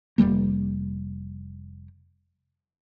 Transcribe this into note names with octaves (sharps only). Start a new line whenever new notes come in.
F1 D#2 G3 A#3